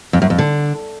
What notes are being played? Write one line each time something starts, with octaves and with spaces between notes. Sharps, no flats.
F2
F#2
F2
D3